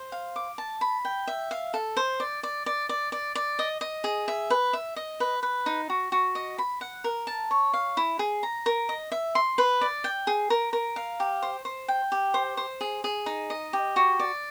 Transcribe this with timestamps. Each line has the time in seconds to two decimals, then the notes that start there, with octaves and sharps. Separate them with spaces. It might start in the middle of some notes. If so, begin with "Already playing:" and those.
Already playing: C5
0.12 F5
0.36 D6
0.58 A5
0.81 B5
1.05 G5
1.27 E5
1.51 F5
1.74 A4
1.97 C5
2.20 D5
2.43 D5
2.66 D5
2.89 D5
3.12 D5
3.35 D5
3.59 D#5
3.81 D#5
4.04 G#4
4.28 E5
4.50 B4
4.73 E5
4.96 D#5
5.20 B4
5.43 B4
5.66 D#4
5.90 F#4
6.12 F#4
6.35 D#5
6.58 B5
6.81 F#5
7.04 A#4
7.27 A5
7.51 C#5
7.74 F5
7.97 E4
8.19 G#4
8.43 A#5
8.66 A#4
8.89 D#5
9.12 E5
9.35 C6
9.58 B4
9.81 D5
10.04 G5
10.27 G#4
10.50 A#4
10.73 A#4
10.96 F5
11.20 G4
11.43 C5
11.65 C5
11.88 G5
12.12 G4
12.34 C5
12.57 C5
12.81 G#4
13.04 G#4
13.26 D#4
13.50 D#5
13.73 G4
13.96 F#4
14.19 D5